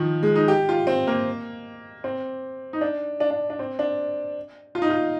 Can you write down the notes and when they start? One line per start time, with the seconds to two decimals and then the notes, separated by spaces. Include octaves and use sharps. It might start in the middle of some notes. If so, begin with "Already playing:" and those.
Already playing: D#3 F3
0.23 G#3
0.35 D#4
0.48 G4
0.69 F4
0.87 C4
1.07 A#3
2.04 C4
2.73 D#4
2.81 D4
3.20 D4
3.30 D4
3.50 D4
3.59 C4
3.79 D4
4.75 F4
4.82 D#4
4.90 F4